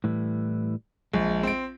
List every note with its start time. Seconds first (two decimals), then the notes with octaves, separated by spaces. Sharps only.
0.04 A2 E3 G3
1.14 A#1 G#3
1.43 C4 D7